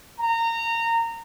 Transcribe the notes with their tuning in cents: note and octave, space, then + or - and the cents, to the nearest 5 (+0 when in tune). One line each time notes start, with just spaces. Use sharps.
A#5 -20